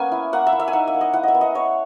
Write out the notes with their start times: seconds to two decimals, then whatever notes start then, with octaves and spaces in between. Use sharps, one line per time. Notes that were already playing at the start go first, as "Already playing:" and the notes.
Already playing: A#3 B3 C#4 G#5
0.12 E4
0.33 A#3 F#5
0.47 E5
0.52 E4
0.60 E5
0.68 G#5
0.73 D#4 F#5
0.87 E5
0.94 A#3
1.01 D#5
1.13 E4 F#5
1.23 D#5 E5
1.34 B3
1.41 D#5
1.55 E4 C#5